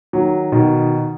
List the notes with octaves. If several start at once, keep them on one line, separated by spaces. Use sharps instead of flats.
D#3 F#3
B2 D#3